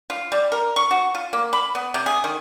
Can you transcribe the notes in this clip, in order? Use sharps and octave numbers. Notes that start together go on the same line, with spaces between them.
F4
G3
A#4
C#6
F#4
F4
A#3
B5
B3
C3
G#4
D#3